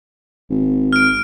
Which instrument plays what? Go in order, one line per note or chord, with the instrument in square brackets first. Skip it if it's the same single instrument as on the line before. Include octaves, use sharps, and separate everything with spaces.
[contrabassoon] G#1
[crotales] F6 D7